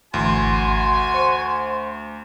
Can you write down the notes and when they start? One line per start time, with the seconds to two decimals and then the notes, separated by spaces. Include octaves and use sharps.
0.14 G#1 D2 E3 F#4 G#5 C6 C7
1.14 C5 C#6